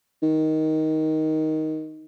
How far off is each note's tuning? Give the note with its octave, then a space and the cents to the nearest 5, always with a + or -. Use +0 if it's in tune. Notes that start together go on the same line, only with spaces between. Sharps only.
D#3 +10